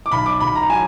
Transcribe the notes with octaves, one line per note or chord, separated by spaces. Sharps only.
D6
B1 B5
D6
B1 B5
A#5
F#3 G#5